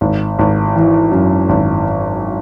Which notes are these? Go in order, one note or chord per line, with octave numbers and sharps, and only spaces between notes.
G#1
G#1
E3
F#2
G#1